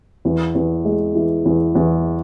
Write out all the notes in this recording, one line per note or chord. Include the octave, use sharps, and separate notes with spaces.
E2
E2
G#3
E3
E2
E2